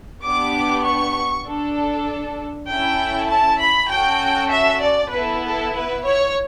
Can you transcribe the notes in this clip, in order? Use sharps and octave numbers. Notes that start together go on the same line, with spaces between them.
B3 D4 G4 D6
C#6
D4 A4
C#4 E4 A4 G5
A5
B5
C#4 F#4 A4 G5
E5
D5
B3 E4 A4 B4
A4
B4
C#5